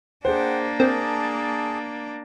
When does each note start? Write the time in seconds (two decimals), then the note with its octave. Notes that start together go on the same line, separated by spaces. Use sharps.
0.25 A#3 D4 G#4 C5 F#5 G5
0.80 C4 G#4 A#4 A5 A#5